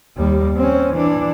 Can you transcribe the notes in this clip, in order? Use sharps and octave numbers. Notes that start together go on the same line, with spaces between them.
D#2 G3
C4 C#4
E3 D4